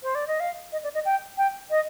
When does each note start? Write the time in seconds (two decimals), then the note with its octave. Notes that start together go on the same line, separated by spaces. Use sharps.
0.03 C5
0.15 D5
0.27 D#5
0.40 F5
0.72 D#5
0.84 D5
0.94 D#5
1.05 G5
1.38 G5
1.70 D#5